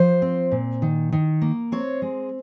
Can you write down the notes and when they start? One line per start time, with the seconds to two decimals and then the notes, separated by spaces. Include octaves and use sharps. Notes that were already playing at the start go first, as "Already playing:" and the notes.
Already playing: F3 C5
0.22 C4
0.52 A#2
0.82 D#3
1.12 D#3
1.41 A#3
1.72 C4 C#5
2.02 G#3